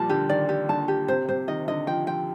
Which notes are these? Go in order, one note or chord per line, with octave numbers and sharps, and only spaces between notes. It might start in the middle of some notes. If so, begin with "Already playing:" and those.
Already playing: A#2 F3 G3 A5
D3 G4
D#3 D5
G4
D3 A5
G4
C3 C5
C3 C5
D#3 D#5
D3 D#5
F3 G5
F3 G5